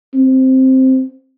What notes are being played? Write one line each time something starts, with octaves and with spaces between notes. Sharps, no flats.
C4